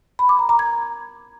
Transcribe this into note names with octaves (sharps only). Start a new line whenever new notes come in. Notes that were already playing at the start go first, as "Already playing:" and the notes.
B5
D6
A#5
A#5
G#6